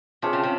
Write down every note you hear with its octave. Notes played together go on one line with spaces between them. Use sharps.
C3 D4 F4 G#4 C#5
C#3
C3